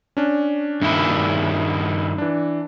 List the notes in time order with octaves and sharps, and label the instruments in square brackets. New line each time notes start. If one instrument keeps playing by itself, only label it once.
[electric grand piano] C#4 D4
[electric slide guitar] G2 D#3 E4
[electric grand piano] E3 D4